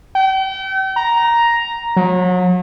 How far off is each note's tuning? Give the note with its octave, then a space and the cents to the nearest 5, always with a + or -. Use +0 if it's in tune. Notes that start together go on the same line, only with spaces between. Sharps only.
G5 -40
A#5 +5
F#3 -35